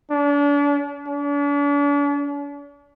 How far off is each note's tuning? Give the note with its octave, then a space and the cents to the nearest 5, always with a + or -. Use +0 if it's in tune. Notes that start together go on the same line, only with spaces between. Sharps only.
D4 -40
D4 -45